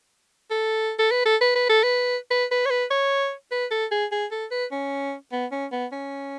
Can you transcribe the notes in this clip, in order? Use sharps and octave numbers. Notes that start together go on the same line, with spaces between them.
A4
A4
B4
A4
B4
B4
A4
B4
B4
B4
C#5
B4
C#5
B4
A4
G#4
G#4
A4
B4
C#4
B3
C#4
B3
C#4